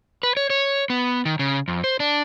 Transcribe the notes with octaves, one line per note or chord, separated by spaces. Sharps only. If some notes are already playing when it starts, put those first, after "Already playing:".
B4
C#5
C#5
B3
D#3
C#3
F2
C5
D4